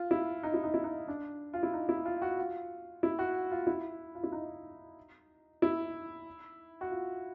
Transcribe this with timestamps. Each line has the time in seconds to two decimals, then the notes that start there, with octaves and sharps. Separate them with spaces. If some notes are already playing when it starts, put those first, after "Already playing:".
Already playing: F4
0.11 E4
0.43 D#4
0.54 E4
0.64 D#4
0.74 E4
0.84 D#4
1.08 D4
1.54 F4
1.63 E4
1.73 D#4
1.89 E4
2.05 F4
2.22 F#4
2.38 F4
3.03 E4
3.19 F#4
3.51 F4
3.67 E4
4.15 F4
4.24 E4
4.32 D#4
5.62 E4
6.81 F#4
6.91 F4